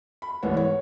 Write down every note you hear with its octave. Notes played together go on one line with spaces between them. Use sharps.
B5
C2 G#2 E3 B3 C#5 F#5
C#5